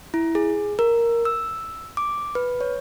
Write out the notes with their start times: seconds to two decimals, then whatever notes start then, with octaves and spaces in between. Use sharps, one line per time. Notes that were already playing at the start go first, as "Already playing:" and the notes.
0.14 E4
0.35 G#4
0.79 A#4
1.25 E6
1.97 D6
2.35 B4
2.61 C#5